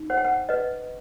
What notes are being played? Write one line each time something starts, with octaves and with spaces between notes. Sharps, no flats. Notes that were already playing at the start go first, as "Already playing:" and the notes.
Already playing: D#4
C5 F#5
G5
F#5
B4 D#5